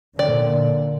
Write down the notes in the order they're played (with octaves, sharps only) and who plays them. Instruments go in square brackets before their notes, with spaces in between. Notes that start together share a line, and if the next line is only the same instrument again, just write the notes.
[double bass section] A#2 D3 [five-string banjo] D5